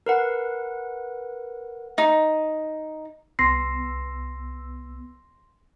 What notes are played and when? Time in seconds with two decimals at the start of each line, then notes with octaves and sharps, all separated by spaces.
0.06 A#4 B4 F#5
1.98 D#4
3.39 C2 B3 C6 E6 A#6 C7